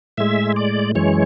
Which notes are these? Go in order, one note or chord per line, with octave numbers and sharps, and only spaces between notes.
A2 G#3 E5
D5
F#2 E3 G#3 C#5